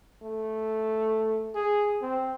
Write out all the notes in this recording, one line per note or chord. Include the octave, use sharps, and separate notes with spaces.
A3
G#4
C4